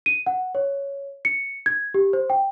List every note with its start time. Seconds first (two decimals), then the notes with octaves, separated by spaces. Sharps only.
0.06 D#7
0.26 F#5
0.55 C#5
1.25 C#7
1.66 G#6
1.94 G4
2.13 C5
2.30 G5